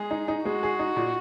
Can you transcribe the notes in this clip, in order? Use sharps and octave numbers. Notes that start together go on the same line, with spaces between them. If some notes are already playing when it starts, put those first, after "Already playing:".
Already playing: G#3 G#4
D#4
D#4
G#3 F#4
G#4
D#4
A#2